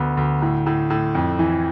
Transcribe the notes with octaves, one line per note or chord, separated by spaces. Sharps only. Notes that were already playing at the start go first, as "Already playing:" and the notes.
Already playing: D2 B3
D2
A2
A2
A2
F2
E3